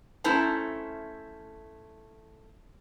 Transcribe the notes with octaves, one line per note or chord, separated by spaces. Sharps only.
A3 C#4 E4 C5 A5 A#5